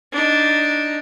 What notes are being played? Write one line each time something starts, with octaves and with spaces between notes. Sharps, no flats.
D4 D#4